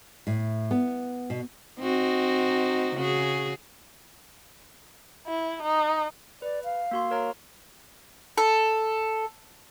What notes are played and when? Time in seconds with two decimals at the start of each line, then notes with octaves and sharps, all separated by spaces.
0.27 A2
0.71 B3
1.30 B2
1.80 C4 D#4 F#4
2.96 C#3 F#4 G#4
5.27 E4
5.63 D#4
6.42 B4 D5
6.64 F5
6.91 A#3 F#4 C6
7.11 A#4 C#5 A#5
8.38 A4